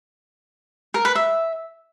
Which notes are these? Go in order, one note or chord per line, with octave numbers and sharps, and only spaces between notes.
A#4
B4
E5